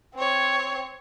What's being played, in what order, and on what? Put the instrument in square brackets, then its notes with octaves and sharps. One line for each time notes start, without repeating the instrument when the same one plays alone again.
[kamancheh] C4 C#5